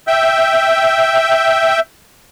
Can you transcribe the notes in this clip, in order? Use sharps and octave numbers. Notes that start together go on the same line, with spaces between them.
E5 G5